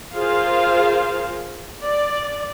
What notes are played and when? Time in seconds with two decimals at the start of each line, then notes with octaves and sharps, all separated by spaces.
0.16 F4 G#4 A#4 C5 F5
1.86 D5